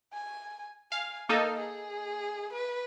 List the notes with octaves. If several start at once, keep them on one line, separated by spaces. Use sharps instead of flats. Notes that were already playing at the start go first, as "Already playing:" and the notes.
G#5
F5 G#5
A#3 D#4 A4 F5
G#4
B4